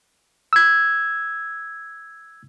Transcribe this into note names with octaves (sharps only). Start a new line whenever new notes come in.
E6 G#6